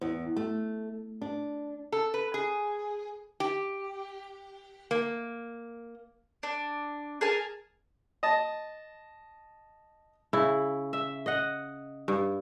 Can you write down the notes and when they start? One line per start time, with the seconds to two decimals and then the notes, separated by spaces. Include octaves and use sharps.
0.01 E2
0.36 A3
1.22 D4
1.92 A4
2.14 B4
2.34 G#4
3.40 G4
4.91 A#3
6.43 D4
7.21 G#4 A#4 G#5 A5
8.23 D#5 A5
10.33 C#3 E4
10.93 E5
11.26 D#5 F#5
12.08 G2